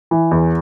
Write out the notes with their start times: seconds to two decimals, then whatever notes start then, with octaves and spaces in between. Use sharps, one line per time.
0.11 E3
0.31 E2